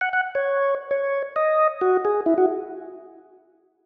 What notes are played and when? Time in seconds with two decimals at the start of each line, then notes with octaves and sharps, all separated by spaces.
0.01 F#5
0.13 F#5
0.35 C#5
0.91 C#5
1.36 D#5
1.81 F#4
2.05 G#4
2.26 E4
2.38 F#4